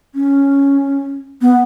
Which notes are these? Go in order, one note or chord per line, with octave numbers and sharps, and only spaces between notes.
C#4
B3